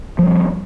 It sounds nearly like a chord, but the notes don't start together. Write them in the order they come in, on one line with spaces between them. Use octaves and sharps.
F3 G3 C4